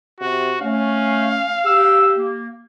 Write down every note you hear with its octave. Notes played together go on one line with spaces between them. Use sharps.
C3 F#4
A3 C#4 F5
G4 E6
A#3